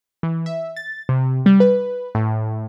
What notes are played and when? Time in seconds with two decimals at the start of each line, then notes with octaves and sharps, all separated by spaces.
0.23 E3
0.46 E5
0.76 A6
1.09 C3
1.46 G3
1.60 B4
2.15 A2